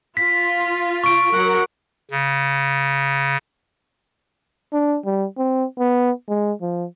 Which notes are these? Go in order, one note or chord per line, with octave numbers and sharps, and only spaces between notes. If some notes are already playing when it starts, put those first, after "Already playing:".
F4 B6
C#6 D7
F#3 A#4 F#5
C#3
D4
G3
C4
B3
G#3
F3